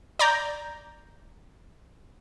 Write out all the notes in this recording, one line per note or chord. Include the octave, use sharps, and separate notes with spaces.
D5 A#5 G6